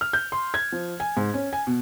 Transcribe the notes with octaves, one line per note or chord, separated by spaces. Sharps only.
F6
G6
C6
G#6
F3
G#5
G#2
C#4
G#5
B2